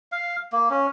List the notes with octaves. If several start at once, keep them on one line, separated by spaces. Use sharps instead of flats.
F5
A#3
C#4